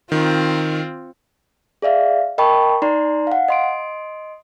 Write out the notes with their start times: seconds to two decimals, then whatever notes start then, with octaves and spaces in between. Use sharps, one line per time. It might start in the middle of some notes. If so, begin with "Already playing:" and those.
0.12 D#3 C4 F4
1.82 G#4 D5 E5 F5
2.38 A#4 D#5 G5 A5 B5 C#6
2.82 D#4 D5 A#5 C6
3.27 F5 F#5
3.48 D#5 C6 D7